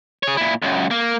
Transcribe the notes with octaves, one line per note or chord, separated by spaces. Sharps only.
G#4 C#5
A#2 E4
C#2 F#2
A#3